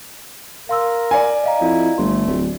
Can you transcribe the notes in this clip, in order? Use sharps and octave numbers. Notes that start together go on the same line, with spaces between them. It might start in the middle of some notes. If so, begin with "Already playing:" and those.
A#4 F5 C6 E6
D5 G#5
D#5 F5 A#5
F2 E4
G1 A3 C6
D1